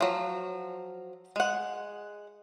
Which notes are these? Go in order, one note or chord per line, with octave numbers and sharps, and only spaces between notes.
F3 F#3
G#3 F#5